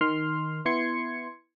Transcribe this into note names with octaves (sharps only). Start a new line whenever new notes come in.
D#3 C6 F6
B3 E4 C6 G#6 C#7